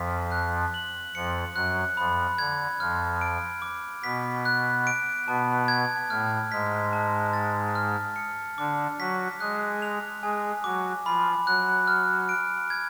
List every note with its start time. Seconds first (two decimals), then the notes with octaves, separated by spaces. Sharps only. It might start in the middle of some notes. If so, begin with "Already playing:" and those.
Already playing: F2 F3 B6
0.32 F#6
0.74 F#7
1.15 F2 F3 C#7
1.55 F#2 F#3 F#6
1.97 F2 F3 B5
2.38 D3 G#6
2.80 F2 F3 F6
3.21 D7
3.62 D6
4.03 B2 B3 B6
4.45 F#6
4.87 D7
5.27 B2 B3 A5
5.68 G#6
6.10 A2 A3 F6
6.52 G#2 G#3 B6
6.93 A5
7.33 A6
7.75 F6
8.16 C#7
8.58 D3 D4 D6
8.99 F#3 F#4 B6
9.40 G#3 G#4 F#6
9.82 F7
10.22 G#3 G#4 G#5
10.64 F#3 F#4 D6
11.05 F3 F4 B5
11.46 F#3 F#4 F#6
11.87 F6
12.29 D7
12.70 G#6